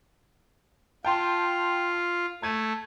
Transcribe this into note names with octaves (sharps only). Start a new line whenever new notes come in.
F4 G5 A5 C6
A3 A5 G#6 D#7